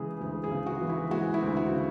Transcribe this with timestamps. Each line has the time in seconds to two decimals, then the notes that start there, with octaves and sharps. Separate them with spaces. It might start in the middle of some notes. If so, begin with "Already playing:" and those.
Already playing: C#3 E3 G#3 G#4
0.21 D2 G#4
0.44 G#4
0.51 C#3
0.66 F#4
0.81 E3
0.90 E4
1.11 G#3 F#4
1.34 E4
1.42 D2
1.57 F#4
1.72 C#3